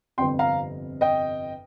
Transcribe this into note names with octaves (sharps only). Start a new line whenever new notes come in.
G1 F2 C3 G5 C6
F5 A#5
D#5 G5